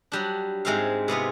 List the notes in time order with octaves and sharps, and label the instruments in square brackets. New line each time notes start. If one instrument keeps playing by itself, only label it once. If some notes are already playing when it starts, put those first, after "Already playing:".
[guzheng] F#3 G3 D4
G#2 G#3 C4 E5 F5
C3 B3 F4 G#4